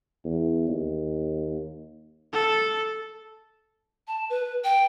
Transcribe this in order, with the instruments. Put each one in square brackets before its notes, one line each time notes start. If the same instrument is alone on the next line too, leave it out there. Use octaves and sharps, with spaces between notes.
[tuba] E2
D#2
[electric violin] A4
[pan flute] A5
B4
G5